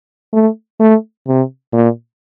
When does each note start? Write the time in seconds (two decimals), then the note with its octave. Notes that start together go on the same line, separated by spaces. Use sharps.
0.33 A3
0.80 A3
1.27 C3
1.73 A#2